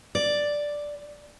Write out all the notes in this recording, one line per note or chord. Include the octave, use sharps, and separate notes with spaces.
D5